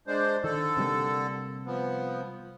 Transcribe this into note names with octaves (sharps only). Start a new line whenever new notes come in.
G#3 D4 C5
D3 D#3 A4
C3 G3 A#3
F3 B3